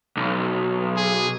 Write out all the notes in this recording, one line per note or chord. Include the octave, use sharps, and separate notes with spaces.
B1
G#4